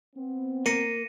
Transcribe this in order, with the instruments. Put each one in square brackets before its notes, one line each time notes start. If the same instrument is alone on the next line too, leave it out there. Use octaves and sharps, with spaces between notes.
[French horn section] B3 C4
[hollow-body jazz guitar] A#3 [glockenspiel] A#6 C#7 D#7